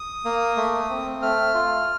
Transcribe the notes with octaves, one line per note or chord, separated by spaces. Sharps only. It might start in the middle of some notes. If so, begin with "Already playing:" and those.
Already playing: D#6
A#3
A3
C4
A3 F6
F4